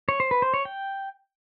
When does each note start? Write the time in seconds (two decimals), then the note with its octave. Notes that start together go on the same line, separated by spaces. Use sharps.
0.09 C#5
0.20 C5
0.31 B4
0.42 C5
0.54 C#5
0.65 G5